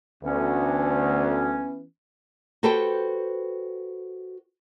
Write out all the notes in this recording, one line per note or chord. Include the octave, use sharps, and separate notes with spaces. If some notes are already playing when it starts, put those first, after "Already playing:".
D2 E3 B3 C#4
F#4 G4 A4 B4 C5 G5